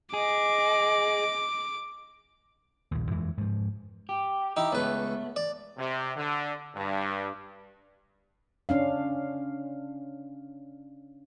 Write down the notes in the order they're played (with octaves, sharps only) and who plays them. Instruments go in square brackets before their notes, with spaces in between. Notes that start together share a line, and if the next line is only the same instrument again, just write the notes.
[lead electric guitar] G#4 [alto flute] D#5 [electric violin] D6
[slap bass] A#1 D#2
F2 E3 G#3
G#2 F3
[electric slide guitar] G4
[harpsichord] D#4 E4 [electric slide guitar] G4
[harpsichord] C#2 B4 [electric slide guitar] A3 B3
[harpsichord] D5
[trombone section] C3
D3
G2
[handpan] C#4 D4 F5